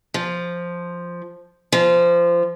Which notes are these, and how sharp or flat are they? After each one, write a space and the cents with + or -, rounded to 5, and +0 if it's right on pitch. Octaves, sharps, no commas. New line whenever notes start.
F3 +0
F3 -20